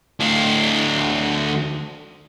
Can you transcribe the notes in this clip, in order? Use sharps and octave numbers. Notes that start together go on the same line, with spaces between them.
D2 F5